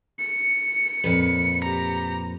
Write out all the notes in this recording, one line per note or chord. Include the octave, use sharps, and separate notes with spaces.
C#7
F2 A#2 B4
G4 A#5